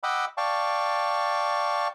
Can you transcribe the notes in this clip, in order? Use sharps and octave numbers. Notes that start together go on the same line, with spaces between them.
D#5 F#5 G5 B5 D6 E6
D5 F5 G5 A5 C#6